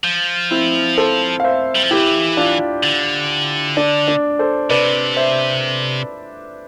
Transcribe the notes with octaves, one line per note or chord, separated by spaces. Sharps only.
F3
C4 E4
A4 C5
F5
C5 E5
G3
F3
E3 E4 G4
D4 F4
D3
D4
D4
A4 C5
C3 B4 D5
C5 E5